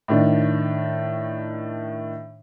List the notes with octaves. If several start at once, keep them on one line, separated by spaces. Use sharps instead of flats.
A2 D#3 D4